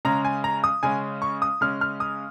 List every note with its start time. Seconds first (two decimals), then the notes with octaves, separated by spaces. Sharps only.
0.05 C#3 G#3 C#4 A#5
0.25 G#5
0.44 A#5
0.64 D#6
0.83 C#3 G#3 C#4 G#5
1.22 C#6
1.42 D#6
1.61 C#3 G#3 C#4 F6
1.81 F6
2.00 D#6